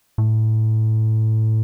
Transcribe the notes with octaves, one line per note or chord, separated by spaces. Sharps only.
A2